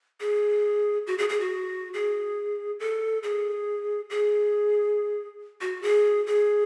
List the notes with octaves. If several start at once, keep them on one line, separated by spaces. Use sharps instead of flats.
G#4
F#4
G#4
G#4
F#4
G#4
A4
G#4
G#4
F#4
G#4
G#4